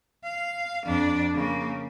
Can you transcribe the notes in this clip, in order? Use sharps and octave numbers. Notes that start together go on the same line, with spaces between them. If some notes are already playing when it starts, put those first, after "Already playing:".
F5
F2 D4
C#3 A#3